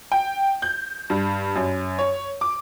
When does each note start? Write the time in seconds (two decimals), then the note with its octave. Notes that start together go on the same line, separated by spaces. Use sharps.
0.12 G5
0.62 G6
1.10 G2
1.55 F#2
1.99 C#5
2.41 D6